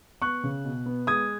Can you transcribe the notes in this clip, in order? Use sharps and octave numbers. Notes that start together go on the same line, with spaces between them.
B3 C#6 F#6
C#3
B2
B3
G#3 D#6 G#6